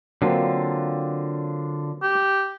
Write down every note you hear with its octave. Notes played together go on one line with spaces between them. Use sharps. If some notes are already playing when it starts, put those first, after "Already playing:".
D3 F#3 A#3 C4 D4 F4
G4